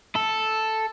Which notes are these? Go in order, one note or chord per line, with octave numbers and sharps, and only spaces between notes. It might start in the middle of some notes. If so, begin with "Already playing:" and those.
A4